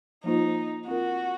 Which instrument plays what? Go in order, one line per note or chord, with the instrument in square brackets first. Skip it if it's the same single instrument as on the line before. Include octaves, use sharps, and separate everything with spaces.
[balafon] F3 A#3 F4 C5 [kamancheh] D#4
[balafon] C4 F4 A#4 [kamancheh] F#4